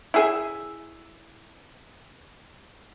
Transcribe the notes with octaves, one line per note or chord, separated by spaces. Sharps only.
E4 G#4 E5